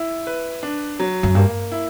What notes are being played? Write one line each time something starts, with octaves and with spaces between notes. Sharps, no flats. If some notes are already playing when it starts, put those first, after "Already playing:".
Already playing: E4
B4
D4
F#3
F#2
G2 A#3
E4